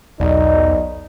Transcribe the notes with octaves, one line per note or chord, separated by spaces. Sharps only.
B1 E2 D#4 D5 D#5